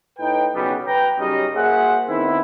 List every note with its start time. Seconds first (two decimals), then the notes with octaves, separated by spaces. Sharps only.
0.19 A2 D#4 B4 G5
0.54 B1 C#3 F#3 G3 B3
0.86 B4 G5 A#5
1.19 F#2 C#3 G3 C#4 D#4 D#5
1.56 A#3 F#4 G#4 C5 E5 F#5
2.09 D#3 B3 C4 E4